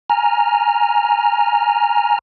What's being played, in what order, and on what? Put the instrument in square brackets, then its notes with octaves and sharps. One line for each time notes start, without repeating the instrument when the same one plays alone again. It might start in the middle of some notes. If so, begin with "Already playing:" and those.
[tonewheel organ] G#5 A#5 F6